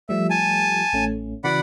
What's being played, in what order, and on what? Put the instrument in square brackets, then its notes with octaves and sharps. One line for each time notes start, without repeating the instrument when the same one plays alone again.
[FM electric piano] F3 G3 A3 [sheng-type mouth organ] E5
[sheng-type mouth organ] G#5 A5
[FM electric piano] A1 A3 C#4
[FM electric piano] C#3 E3 F#4 [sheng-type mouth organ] D5 F#5 B5